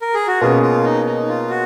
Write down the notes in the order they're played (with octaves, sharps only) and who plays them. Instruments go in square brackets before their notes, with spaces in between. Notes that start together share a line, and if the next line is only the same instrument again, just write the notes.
[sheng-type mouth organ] A#4
G#4
F#4
[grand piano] B2 A#3 C#4 G#4 B4 [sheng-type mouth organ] F4
[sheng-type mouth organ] F4
D#4
D#4
F4
F#4